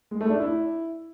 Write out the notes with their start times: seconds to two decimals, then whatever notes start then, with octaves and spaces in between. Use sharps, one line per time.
0.11 G#3
0.21 A3
0.30 D4
0.39 E4